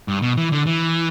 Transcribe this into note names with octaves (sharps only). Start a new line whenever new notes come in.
G2
B2
E3
D3
E3